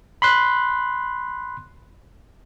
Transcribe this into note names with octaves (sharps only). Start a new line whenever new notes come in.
B5 C6 F#6